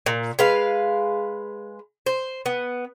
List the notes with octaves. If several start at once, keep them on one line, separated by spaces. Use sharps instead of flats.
A#2
G#3 B4 F5
C5
B3